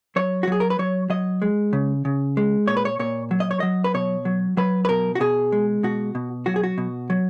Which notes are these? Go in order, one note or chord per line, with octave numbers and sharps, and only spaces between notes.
F#3 C#5
F#4
F#3 G#4
A#4
B4
F#3 C#5
F#3 D#5
G#3
C#3
C#3
G#3
A#2 C#5
B4
C#5
A#2 C#5
F#3
D#5
C#5
F#3 D#5
B4
B2 C#5
F#3
F#3 B4
B4
B2 A#4
F#4
B2 G#4
G#3
B2 F#4
B2
F#3 F#4
G#4
F#4
B2
F#3